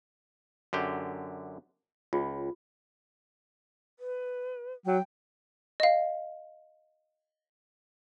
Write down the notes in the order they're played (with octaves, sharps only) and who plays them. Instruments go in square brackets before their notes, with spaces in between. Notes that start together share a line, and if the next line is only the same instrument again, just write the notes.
[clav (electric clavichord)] F#2 D3 G4
[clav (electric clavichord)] C#2 [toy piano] F4 G#4
[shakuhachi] B4
[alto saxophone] F#3 [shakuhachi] G5
[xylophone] D#5 F5